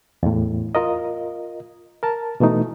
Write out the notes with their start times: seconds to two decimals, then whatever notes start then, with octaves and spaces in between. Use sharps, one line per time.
0.23 E2 A2
0.75 F4 A#4 D#5
2.03 A#4 A5
2.40 B2 E3 A3 D#4